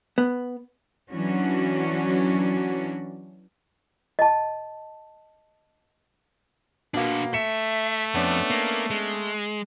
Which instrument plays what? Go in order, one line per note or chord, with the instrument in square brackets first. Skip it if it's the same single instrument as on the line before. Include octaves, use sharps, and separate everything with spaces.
[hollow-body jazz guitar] B3
[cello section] E3 F#3 C#4 D4 F#4
[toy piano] D#5 A5
[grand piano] B2 A#3 [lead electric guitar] D4 A#4
[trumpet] A3 [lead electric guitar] E5 [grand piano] C#7 E7
[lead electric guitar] F2 [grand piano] B3 C#4 D4
[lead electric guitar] A#3
G#3